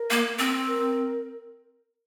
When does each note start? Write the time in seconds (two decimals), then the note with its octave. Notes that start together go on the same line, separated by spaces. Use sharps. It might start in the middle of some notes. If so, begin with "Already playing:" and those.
Already playing: A#4
0.11 A#3
0.39 C4
0.68 A#4